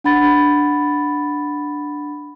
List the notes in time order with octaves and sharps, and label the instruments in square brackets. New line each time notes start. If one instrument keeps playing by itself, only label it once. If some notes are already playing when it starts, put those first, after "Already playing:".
[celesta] D4 F#5 B5 A6